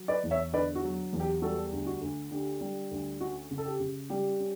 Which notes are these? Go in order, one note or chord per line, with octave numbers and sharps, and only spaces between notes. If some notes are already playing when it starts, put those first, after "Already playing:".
Already playing: F#3
B4 D5
E2
C#5 E5
D3 B4 D5
F#4
F#3
E2
G4
G3 F#4 A4
D2
F#4
D2
D3 G4
G3
D2
C#4 F#4
C#3
A4
G4
C#3
G3 G4
C#4